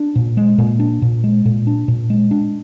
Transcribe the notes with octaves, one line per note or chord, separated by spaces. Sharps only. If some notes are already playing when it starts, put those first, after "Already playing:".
Already playing: D4
A#2
G#3
A#2
D4
A#2
G#3
A#2
D4
A#2
G#3
D4